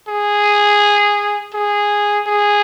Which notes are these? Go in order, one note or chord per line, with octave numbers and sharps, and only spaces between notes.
G#4
G#4
G#4